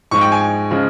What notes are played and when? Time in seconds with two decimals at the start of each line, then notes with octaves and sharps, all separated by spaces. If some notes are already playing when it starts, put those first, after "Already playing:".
0.11 G#2 F3 G#3 C#6
0.21 G5
0.32 G#5
0.71 C#3 F3 G#3